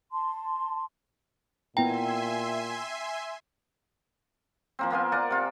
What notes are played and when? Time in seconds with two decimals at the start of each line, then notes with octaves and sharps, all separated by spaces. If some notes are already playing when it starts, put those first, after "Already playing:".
0.12 A5 C6
1.77 A#2 B3 E4 E5 G5 G#5 A#5 C6
4.79 F3 A#3 C4
4.90 A#3 B3 F4 G#5
5.12 A#4 D5 F#5 G#5
5.31 C3 F4